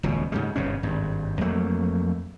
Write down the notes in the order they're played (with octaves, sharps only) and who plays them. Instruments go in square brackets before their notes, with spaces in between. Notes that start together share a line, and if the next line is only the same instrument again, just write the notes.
[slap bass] D#1 C#2 B2
G#2 C#3 G3
G1 G#2 B2 C#4
G#1 G2
F2 F#3 A3 A#3